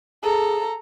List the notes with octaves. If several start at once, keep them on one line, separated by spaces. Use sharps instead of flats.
G#4 A4 A#5